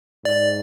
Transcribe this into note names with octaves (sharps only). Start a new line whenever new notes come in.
G#2 D5